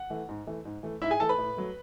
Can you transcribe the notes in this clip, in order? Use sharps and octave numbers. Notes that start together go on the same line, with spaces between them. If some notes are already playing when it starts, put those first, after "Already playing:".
Already playing: F#5
E3 A3
G#2
E3 A3
G#2
E3 A3
G#2 E4 E5
G#4 G#5
E3 A3 A4 A5
B4 B5
A2
F#3 A3